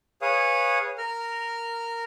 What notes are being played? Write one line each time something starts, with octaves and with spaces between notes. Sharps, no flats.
G#4 B4 C#5 F5 D#6
A#4 F6